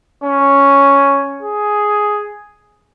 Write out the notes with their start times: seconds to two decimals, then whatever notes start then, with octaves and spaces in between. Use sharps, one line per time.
0.24 C#4
1.43 G#4